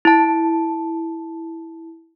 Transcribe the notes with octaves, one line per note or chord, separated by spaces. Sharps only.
E4 A5